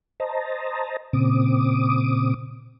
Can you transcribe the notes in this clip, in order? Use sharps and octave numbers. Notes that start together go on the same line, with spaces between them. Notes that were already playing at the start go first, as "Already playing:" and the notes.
C5 D#5 A5 A#5
A#2 C#3 C4 D6 D#6